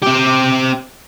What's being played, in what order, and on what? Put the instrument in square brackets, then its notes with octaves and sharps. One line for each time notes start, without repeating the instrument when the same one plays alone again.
[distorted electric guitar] C4 G4